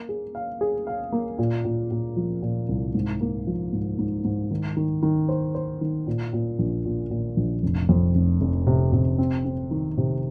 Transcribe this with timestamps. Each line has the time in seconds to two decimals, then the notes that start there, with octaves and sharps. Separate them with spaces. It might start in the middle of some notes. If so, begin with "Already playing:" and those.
Already playing: A#3
0.09 G#4
0.35 F5
0.61 G#4
0.87 F5
1.12 A#3
1.38 A#2
1.65 A#2
1.91 A#2
2.16 F3
2.42 A#2
2.69 C2
2.94 G#2
3.21 A#3
3.47 F3
3.73 G#2
3.99 G#2
4.24 G#2
4.51 D#3
4.77 D#3
5.03 D#3
5.29 C5
5.55 C5
5.81 D#3
6.07 A#2
6.33 A#2
6.59 A#1
6.85 A#2
7.11 A#2
7.37 A#1
7.63 F1
7.89 F2
8.15 F1
8.41 F1
8.67 C3
8.93 C3
9.18 C4
9.45 C4
9.71 D#3
9.97 C3